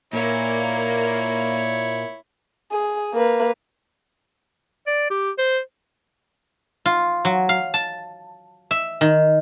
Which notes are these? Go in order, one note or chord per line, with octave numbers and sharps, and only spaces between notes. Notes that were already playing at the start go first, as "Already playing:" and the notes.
A#2 A#3 E4 C#5
G#4
A#3 B4
D5
G4
C5
F4
F#3
F5
A5
E5
D#3